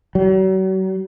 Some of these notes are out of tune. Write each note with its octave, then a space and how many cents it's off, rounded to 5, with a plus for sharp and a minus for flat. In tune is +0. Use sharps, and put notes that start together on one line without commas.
F#3 +40